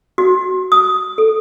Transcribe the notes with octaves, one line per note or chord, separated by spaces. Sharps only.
F#4
D#6
A4